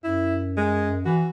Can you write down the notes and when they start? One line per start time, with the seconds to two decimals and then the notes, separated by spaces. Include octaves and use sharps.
0.04 F#2 E4
0.57 G#3
1.05 E3 F#4